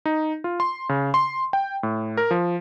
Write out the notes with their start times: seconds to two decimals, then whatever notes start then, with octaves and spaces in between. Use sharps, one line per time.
0.06 D#4
0.44 F4
0.60 C6
0.89 C#3
1.14 C6
1.53 G5
1.83 A2
2.17 A#4
2.31 F3